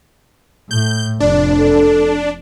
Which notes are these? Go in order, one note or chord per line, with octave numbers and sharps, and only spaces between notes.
A2 G6
F1 D4 D5
A4